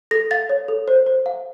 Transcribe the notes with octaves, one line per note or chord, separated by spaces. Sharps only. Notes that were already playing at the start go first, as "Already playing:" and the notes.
A4 A#6
F5 A6
C#5
A4
C5
C5
F5